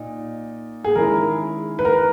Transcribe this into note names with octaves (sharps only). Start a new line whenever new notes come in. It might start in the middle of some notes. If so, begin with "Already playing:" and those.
Already playing: A#2 D#4
G#4
D#3 G#3 C#4 E4 A#4
B4
A#4